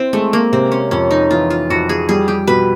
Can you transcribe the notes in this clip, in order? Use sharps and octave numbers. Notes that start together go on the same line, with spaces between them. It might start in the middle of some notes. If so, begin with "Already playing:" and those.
Already playing: C4 E4
G#3 A3
A#3
C3 C4
C#4
F2 C#4
D#4
E3 F4
F4
F2 F#4
G#4
G3 G#4
G4
B2 B4